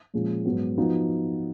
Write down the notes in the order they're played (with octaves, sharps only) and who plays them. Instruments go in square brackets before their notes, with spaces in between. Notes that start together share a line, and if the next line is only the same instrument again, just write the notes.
[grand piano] A#2 F3 G#3 C#4
G#2 F#3 B3
F3 B3 D#4 F#4